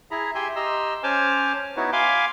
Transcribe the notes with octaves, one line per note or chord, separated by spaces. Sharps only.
E4 G#4 A#5 B5
G4 E5 G5 G#5 C6
G4 D#5 A#5 C6 E6
C#4 C5 G#5 A5 D6 F6
B3 D#4 E4 F#4 B4 C#5
F5 G#5 B5 C6 D6